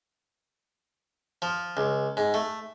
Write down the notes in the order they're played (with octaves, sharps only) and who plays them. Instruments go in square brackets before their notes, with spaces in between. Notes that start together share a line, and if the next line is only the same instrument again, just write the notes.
[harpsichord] F3
C#2
G#2
A3